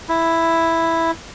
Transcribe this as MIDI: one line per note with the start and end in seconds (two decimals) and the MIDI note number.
0.09 1.11 64